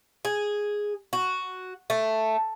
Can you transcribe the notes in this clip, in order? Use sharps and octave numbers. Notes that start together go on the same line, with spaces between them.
G#4
F#4
A3